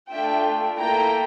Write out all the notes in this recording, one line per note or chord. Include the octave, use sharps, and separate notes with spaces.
A3 D4 F4 E5 G5
A#3 E4 A4 G5 A#5